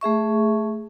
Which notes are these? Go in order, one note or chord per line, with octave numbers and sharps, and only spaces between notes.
A3 G#4 E5 C#6